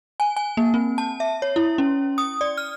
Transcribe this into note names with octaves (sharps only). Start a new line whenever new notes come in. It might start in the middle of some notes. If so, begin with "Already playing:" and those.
G#5
G#5
A#3
C4
A5
E5
C#5
E4
C#4
D#6
D5
F6